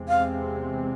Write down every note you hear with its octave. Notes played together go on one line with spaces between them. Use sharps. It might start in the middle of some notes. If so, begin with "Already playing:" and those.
Already playing: E2 C3 G#3 C4
F5